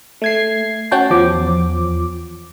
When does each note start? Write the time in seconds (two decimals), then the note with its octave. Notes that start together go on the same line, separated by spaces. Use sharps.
0.22 A3 G#6 C7
0.91 C#4 F#4 G5 A5
1.10 E2 F3 D6